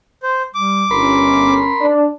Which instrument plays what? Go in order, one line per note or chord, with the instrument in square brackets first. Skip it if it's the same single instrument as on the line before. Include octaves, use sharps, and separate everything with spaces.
[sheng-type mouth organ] C5
[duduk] G3 [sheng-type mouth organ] D6
[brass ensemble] G1 [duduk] C#4 [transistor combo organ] A#4 B5 C6
[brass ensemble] D4